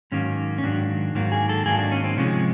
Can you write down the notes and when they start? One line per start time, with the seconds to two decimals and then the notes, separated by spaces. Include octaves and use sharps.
0.12 G#2 D#3 F#3 A#3 C#4
0.58 C#4
0.64 G#2 D#3 F#3 A#3 D4
1.14 G#2 D#3 F#3 A#3
1.32 G#4
1.49 A4
1.66 G#2 D#3 F#3 A#3 G#4
1.79 D4
1.92 C#4
2.04 C4
2.17 C3 F3 G#3 C#4